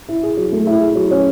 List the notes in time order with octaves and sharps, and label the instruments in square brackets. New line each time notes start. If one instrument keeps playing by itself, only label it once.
[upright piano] E4
G#4
F#3
A3
E4
G#4
F#3
C#4